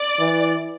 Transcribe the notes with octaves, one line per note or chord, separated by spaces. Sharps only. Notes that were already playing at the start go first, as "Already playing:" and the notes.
Already playing: D5
E3